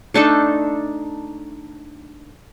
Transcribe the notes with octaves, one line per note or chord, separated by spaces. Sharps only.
A3 D4 D#4 A4